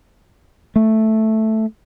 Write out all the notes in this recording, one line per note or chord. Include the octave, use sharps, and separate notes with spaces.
A3